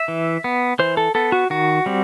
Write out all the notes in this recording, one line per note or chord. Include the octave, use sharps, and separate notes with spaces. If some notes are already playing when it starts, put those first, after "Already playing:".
Already playing: E5
E3
B3
E3 C5
A4
B3 A4
F#4
D#3 F#4
G3 C4